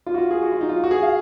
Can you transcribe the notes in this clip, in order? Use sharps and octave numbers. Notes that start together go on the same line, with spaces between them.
F4
F#4
F4
G#4
F#4
F4
D#4
F4
F#4
G#4
F5